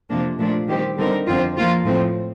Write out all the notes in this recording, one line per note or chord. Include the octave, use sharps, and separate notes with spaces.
F2 C3 F3 A#3 D4
A#2 F3 A3 D4
D#3 G3 C4 G4
D3 G3 C4 D#4 A#4
F2 D3 F3 C4 F4
F3 A#3 F4
A2 F3 C4